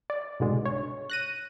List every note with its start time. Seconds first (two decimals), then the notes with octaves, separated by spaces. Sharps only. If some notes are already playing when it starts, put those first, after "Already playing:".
0.10 D5
0.40 C2 G#2 B2 D3 G#3
0.65 C#5
1.10 F#6 A#6 D#7